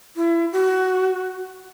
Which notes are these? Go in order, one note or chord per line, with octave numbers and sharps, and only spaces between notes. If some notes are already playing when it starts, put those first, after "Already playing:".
E4
F#4